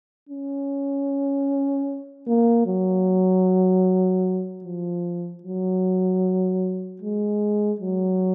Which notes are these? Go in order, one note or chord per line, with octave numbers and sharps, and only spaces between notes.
C#4
A#3
F#3
F3
F#3
G#3
F#3